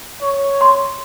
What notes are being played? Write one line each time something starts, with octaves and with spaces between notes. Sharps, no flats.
C#5
C6